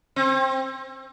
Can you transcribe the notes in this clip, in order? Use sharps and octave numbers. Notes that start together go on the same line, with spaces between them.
C4